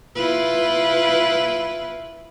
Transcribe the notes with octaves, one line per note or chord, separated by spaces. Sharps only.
E4 F4 B4